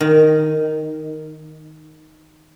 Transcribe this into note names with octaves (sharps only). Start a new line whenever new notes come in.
D#3